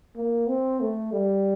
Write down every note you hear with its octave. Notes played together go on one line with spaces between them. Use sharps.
A#3
C4
A3
G3